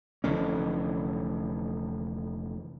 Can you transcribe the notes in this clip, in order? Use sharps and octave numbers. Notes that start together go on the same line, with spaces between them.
F1 D3 E3 C#4